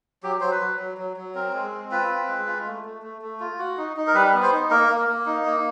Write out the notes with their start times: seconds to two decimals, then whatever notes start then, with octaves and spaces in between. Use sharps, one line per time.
0.23 F#3 G4
0.40 F#3 C5
0.51 B4
0.61 F#3
0.79 F#3
0.98 F#3
1.17 F#3
1.35 C4 A#4
1.53 G#3
1.72 C4
1.91 F4 B4
2.10 C4
2.29 G#3
2.46 F4
2.66 A3
2.85 A3
3.02 A3
3.22 A3
3.40 F4
3.59 F#4
3.77 D#4
3.97 D#4
4.07 A#4
4.14 G3 B4
4.34 B3
4.42 C5
4.52 D#4
4.71 A#3 A#4
4.89 A#3
5.08 A#3
5.26 D#4
5.46 A#3